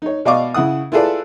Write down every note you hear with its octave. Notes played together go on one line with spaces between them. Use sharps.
D#4 C#5
B2 D5 D#5 F5 C#6 D6
C#3 E4 F#5 D#6
E4 F4 G#4 A4 B4 D5